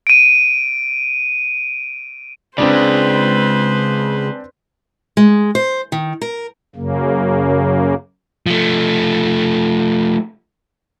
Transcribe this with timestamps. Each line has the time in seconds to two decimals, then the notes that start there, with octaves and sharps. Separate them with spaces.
0.07 D7 D#7
2.58 C#3 G#3 C4 D4 B4 C5 D5
5.17 G#3
5.55 C5
5.92 D#3
6.21 A#4
6.76 F#2 C#3 A#3
8.46 F3 A3